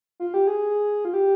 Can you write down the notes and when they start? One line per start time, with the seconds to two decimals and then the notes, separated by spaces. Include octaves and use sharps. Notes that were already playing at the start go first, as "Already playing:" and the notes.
0.20 F4
0.34 G4
0.47 G#4
1.05 F4
1.14 G4